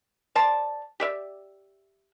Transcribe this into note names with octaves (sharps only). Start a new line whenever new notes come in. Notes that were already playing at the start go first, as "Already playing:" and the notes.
C5 D5 A5
G4 D5 E5